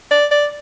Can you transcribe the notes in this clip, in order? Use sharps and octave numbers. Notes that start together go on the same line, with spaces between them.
D5
D5